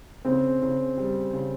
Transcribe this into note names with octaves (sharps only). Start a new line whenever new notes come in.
C#3 C4
C#3
G3
C#3